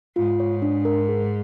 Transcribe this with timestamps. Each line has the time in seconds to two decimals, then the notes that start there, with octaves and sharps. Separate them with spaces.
0.16 G#2 F4
0.40 C#5
0.62 D4
0.85 A#4
1.08 G#4